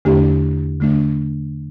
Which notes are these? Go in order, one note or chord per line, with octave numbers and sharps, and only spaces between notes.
E2 D3 A3 D4 G4
D3 A3 D4